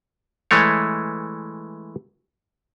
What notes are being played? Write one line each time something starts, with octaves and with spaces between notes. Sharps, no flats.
E3 G#3 A3 C#5